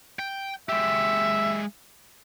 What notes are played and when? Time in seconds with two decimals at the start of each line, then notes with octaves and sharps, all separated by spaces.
0.19 G5
0.69 G#3 G4 E5